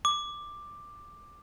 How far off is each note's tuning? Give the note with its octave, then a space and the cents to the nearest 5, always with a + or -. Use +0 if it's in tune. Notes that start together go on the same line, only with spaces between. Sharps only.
D6 +10